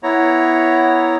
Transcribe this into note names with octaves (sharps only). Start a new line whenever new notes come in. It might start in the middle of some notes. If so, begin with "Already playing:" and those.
B3 E4 C#5 A#5